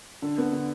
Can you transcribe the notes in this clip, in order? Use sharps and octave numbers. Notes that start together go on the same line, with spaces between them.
D3
B3
D3